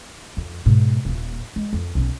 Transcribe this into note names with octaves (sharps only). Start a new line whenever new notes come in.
F2
G#2 B2
D#1 A#2
G#3
F2
B1 C#4